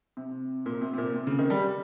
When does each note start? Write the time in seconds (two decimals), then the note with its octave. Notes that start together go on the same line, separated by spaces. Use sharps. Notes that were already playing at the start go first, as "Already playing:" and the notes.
0.17 C3
0.66 A#2
0.81 C3
0.93 C3
0.98 A#2
1.14 C3
1.27 C#3
1.39 D#3
1.50 G3